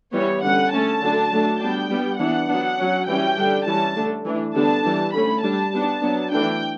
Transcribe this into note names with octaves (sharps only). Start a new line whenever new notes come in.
E3 G3 B3 C#5
D3 G3 C#4 F#5
D3 A3 C#4 A5
D3 F#3 A3 D4
F#3 A3 D4
G3 B3 D4 G5
G3 B3 D4
E3 B3 D4 F#5
F#3 B3 D4
F#3 C#4
E3 G3 C#4 G5
D3 G3 D4
E3 G3 C#4 A5
D3 A3 D4
E3 A3 D4
D3 G3 B3 D4 A5
E3 G3 D4
D3 A3 C#4 B5
G3 D4 A5
G3 B3 D4
F#3 B3 D4
E3 A3 D4 G5